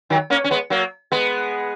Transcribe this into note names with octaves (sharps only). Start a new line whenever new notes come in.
D#3 F#3
A#3 C#4
C#4
G#3 B3
F#3 A#3
G#3 B3